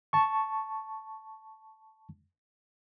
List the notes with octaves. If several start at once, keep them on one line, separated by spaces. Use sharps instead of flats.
A5 C#6